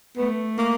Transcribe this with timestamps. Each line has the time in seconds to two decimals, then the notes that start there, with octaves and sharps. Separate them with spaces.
0.17 A3 B3
0.58 A#3